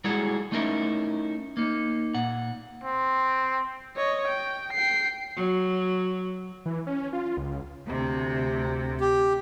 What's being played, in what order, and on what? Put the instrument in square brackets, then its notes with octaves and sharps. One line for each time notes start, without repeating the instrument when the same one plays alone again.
[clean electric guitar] G3 G#3 E4 F#4 G#4 A4
A3 C#4 D#4 E4 A#4
A#3 D#4
A#2 F#5
[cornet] C4
[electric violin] C#5 D#5
G5
G5 C7
[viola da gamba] F#3
[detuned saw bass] E3
C#4
F4
C#2
[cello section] D2 C3
[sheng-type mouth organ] G4